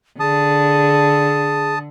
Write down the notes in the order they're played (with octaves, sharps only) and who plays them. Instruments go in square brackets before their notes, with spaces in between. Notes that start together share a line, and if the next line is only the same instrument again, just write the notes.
[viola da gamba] D3 [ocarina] G#4 [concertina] A5 D#6